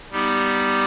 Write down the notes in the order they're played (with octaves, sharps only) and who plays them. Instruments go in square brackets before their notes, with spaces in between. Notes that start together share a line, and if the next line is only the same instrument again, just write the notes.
[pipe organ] G3 B3 D#4 G4